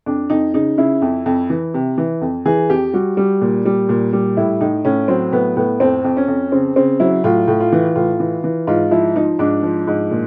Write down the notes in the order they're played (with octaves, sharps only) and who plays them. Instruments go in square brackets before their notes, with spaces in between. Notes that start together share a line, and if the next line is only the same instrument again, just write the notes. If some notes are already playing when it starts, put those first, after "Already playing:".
[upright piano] F2 D4
F2 D#4
C#3 D#4
C#3 E4
F2
F2
E3
C3
E3
F2
E3 G#4
F2 G4
G3 F#4
G3
A#2
G3
A#2
G3
A2 E4
A2 D#4
A2 C#4
F#3 C4
A2 B3
A2 B3
F2 C4
F2
C#4
F2
C#3 C4
C#3 C4
F#3 E4
A2 F4
A2
F4
E3
A2 F4
E3
E3
G#2 F4
F3 E4
F3 D#4
G#2 D4
F3
G#2
A#2